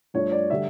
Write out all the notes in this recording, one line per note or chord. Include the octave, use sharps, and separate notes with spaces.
G2 F3 A3 D4 C#5
D5
D3 G3 E5